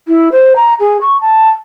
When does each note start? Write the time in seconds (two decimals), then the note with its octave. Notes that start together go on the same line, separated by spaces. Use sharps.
0.08 E4
0.32 C5
0.56 A#5
0.80 G#4
1.01 C#6
1.21 A5